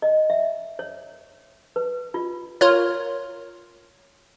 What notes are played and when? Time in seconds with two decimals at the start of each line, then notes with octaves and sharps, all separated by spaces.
0.02 D#5
0.30 E5
0.79 C#5
1.76 B4
2.14 F4
2.61 F4 A#4 C#5